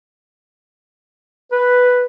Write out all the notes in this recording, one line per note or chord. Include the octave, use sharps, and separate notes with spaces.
B4